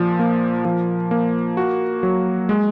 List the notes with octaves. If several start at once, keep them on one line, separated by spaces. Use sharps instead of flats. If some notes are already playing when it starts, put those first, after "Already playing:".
Already playing: A#2 F3
A#3
F3
A#3
F#4
F#3
G#3